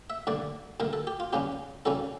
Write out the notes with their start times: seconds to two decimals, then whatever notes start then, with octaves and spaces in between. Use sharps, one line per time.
0.10 E5
0.27 G2 D3 A3 D5
0.80 G2 D3 A3 A#4
0.93 A4
1.07 G4
1.20 F4
1.33 E2 C#3 G3 C#4 G4
1.85 E2 C#3 G3 C#4 A4